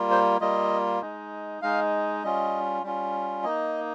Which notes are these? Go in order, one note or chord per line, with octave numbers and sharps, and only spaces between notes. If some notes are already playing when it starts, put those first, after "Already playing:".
Already playing: G3 A#3 F4
C5
G3 A#3 F4 D#5
G#3 D#4
G#3 D#4 F5
G3 C#4 F4 D#5
G3 C#4 F4
A#3 D#4 D#5